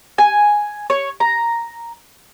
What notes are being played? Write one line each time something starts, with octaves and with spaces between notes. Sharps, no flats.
G#5
C#5
A#5